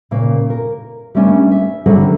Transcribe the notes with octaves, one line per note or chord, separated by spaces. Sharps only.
A#2 C#3 A#3
A#4
G3 A3 A#3 C#4 D4
E5
D3 F#3 G3 C#4 G#4 A4